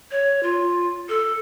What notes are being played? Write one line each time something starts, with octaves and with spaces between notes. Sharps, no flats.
C#5
F4
A4